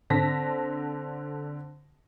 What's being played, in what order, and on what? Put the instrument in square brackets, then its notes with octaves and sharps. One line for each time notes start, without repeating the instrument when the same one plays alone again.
[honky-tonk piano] D3 C4 A5 A#6 B6